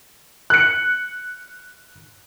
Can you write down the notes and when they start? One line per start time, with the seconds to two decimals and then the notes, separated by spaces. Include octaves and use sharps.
0.50 F#6 C#7